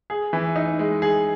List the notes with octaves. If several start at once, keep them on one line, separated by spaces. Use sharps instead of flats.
G#4
E3
D#4
G#3
G#4